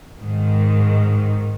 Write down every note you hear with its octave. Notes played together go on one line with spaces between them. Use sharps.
G#2 D#3